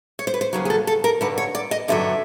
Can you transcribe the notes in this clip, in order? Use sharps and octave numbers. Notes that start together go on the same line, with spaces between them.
C#5
C5
B4
C5
D#2 C#3 F#3 G#4
G#4
A4
A4
A#4
G2 D3 F#3 B4
C#5
D5
D#5
G2 D3 F#3 E5